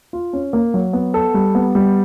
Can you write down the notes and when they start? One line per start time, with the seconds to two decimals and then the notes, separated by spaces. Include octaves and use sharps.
0.13 F4
0.33 C#4
0.53 A#3
0.74 F#3
0.93 B3
1.14 A4
1.34 G3
1.55 B3
1.75 G3